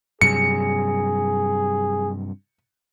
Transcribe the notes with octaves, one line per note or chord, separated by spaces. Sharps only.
G2 C3 F#3 G#4 C#7